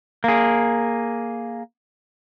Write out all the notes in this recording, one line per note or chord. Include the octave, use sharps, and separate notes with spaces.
A#3 G#4